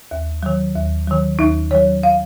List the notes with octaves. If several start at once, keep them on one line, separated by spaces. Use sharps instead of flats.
D#2
D#3 F#3
D#2
D#3 F#3
D#2 D#4
D#3 F#3 C#5
F5